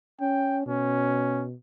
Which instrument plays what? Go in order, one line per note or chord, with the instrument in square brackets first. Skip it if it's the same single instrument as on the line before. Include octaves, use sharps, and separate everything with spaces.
[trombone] C#4 [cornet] G5
[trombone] B2 [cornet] C#4